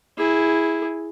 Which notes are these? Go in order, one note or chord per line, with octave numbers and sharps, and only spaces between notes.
E4 G#4